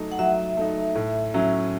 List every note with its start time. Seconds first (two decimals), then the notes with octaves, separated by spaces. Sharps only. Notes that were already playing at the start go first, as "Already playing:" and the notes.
Already playing: F#3 A3 D#4
0.12 F#5
0.19 F#3 E5
0.57 A3 D#4
0.95 A2
1.34 F#3 C#4 E4